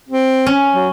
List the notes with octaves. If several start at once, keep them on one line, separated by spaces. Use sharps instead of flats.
C4
C#4
F#3